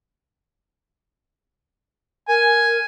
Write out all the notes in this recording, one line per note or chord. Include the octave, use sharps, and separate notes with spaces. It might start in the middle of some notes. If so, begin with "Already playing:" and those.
A#4 G#5